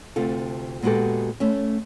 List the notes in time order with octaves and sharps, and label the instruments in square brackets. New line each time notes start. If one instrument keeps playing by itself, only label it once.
[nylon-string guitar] D2 C3 F4 A4
A#2 G#3 B3 F#4 G4 A4
A3 C#4